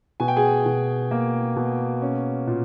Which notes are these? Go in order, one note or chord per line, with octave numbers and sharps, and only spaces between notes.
B2 G#5
G5
G#4 G#5
B2
A#3
B2
C#4
A#2